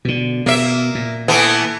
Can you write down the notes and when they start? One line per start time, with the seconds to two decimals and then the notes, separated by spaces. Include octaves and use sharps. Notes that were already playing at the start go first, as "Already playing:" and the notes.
0.05 B2 D3
0.46 B2 A#3 E5
0.95 A#2
1.28 E3 A3 B3